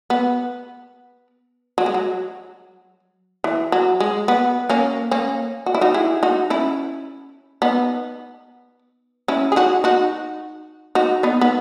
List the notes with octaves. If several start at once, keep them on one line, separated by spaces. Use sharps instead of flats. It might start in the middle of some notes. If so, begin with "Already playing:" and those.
B3
F#3
G#3
F#3
E3
F#3
G#3
B3
A#3 C#4
A#3 C#4
F#4
E4
D#4 F#4
E4 G#4
D#4 F#4
C#4 E4
B3 D#4
C#4 E4
G#4
D#4 F#4
D#4 F#4
D#4 F#4
B3 D#4
B3